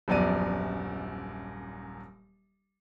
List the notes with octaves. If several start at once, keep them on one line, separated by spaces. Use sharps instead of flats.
D#1 A#1 F#2 B3 D5 D#7